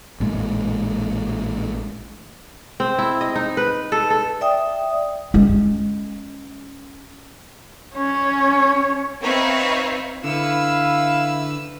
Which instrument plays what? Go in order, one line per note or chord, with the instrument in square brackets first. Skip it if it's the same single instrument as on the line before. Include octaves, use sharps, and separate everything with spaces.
[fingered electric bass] A1 A#2 G#3
[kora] C4
E4
D#5
D#4
B4
A4
A4
[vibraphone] D5 E5 G5 D#6
[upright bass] G#3 C#4
[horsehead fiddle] C#4 C#5
[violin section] C4 D#4 B4 C#5 E5 F5
[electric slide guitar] D3 [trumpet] E4 [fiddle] B4 E6 [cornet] F5